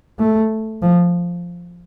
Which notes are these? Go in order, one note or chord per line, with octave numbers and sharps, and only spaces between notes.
A3
F3